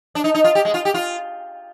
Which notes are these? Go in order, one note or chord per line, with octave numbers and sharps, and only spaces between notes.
D4
D#4
D#4
F4
G4
G#3
F4
G4
F4